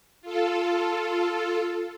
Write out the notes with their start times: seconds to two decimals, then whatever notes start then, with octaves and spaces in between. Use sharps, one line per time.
0.21 F4 A4